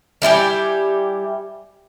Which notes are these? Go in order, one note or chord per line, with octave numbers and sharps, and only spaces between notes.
G3 E4 G4 G#5